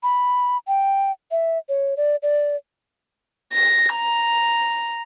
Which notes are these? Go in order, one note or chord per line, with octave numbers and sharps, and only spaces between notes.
B5
G5
E5
C#5
D5
D5
A#6
A#5